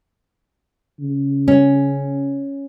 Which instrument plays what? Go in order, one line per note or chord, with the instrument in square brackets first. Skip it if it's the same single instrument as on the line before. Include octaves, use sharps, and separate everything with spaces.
[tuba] C#3
[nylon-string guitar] C#4